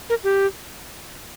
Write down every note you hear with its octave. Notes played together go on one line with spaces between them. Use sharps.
A#4
G4